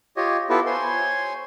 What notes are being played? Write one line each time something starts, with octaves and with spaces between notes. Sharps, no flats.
F4 G4 C#5 D#5
B3 E4 F4 G4 A4 B4
C5 C#5 G#5 C6